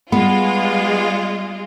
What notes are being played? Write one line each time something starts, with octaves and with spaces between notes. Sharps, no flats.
G3 G#3 B3 F4